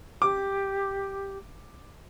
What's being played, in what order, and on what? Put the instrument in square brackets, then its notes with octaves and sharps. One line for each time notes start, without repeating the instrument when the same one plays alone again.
[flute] G4 [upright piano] D6